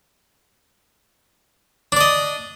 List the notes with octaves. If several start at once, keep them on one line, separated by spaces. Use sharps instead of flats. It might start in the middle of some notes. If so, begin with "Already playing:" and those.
D4 D5 D#5